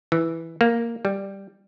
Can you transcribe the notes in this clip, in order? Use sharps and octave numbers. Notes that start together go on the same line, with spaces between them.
E3
A#3
G3